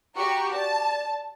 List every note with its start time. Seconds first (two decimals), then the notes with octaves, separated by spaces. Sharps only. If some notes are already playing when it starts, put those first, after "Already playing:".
0.15 F#4 G4 A#5 C#6
0.52 D5 A5